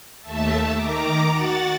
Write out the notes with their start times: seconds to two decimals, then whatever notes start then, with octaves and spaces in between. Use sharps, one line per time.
0.21 D#2 A3 E5 A5
0.73 D#3 A#5 D6
1.29 F#4 F#5 A6